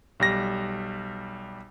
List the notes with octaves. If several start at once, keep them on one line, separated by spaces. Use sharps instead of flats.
B1 G3 A#6